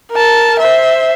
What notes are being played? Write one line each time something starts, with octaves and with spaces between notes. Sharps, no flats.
A#4 A5
C5 E5